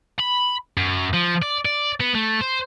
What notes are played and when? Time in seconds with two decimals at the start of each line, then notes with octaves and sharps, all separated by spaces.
0.20 B5
0.77 F#2
1.14 F3
1.42 D5
1.65 D5
2.00 B3
2.15 A3
2.41 C5